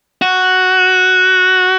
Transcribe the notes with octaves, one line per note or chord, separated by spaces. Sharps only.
F#4